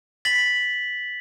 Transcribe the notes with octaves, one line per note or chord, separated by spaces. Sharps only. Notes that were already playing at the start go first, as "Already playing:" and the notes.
A6 B6 F#7